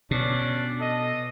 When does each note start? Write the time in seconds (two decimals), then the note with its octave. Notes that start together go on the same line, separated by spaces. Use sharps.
0.11 B2 C#4 D4
0.80 A4 D#5